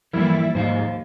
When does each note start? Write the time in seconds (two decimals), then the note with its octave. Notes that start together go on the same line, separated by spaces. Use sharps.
0.13 G2 E3 F3 G3 A#3 E4 A4 A#4
0.55 D#2 G#2 C5 E5 F5